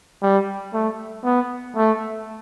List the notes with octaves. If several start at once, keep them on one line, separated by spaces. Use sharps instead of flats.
G3
A3
B3
A3